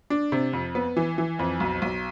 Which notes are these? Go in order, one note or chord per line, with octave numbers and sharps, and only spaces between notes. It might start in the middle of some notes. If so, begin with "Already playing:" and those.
D4
C3
F2
B3
E3
E3
F2
B1
B1